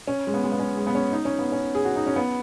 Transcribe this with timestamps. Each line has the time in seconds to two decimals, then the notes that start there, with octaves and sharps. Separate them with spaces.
0.07 C#4
0.27 G#3
0.34 B3
0.44 G#3
0.52 B3
0.59 C#4
0.77 G#3
0.87 B3
0.95 C#4
1.12 D#4
1.25 C#4
1.39 B3
1.52 C#4
1.75 G#4
1.85 F#4
1.96 D#4
2.06 C#4
2.16 B3